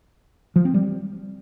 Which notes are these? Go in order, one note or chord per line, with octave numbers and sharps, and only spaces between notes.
F3
C4
G3